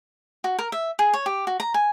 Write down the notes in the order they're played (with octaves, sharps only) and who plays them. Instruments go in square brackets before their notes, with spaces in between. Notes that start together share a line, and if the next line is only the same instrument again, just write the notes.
[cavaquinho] F#4
A#4
E5
G#4
C#5
G4
F#4
A#5
G#5